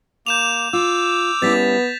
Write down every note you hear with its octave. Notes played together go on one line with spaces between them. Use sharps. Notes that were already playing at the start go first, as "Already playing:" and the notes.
A#3 D6 G6 E7 F7
F4 D6 E6
G3 B3 C#4 E4 A6 B6